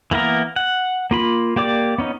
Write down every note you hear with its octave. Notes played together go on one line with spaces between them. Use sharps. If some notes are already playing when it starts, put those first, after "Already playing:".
E3 A#3 B3 A#4
F#5
A#3 F4 B5
A#3 G4 D5 D6
B3 C#4 D#4